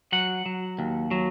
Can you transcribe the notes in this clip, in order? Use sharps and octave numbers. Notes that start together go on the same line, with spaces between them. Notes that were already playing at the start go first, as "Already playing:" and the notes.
F#3 F#5
F#3
D#2
F#3